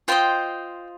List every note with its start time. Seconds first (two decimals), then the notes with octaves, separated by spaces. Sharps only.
0.08 F4 C5 D#5 G5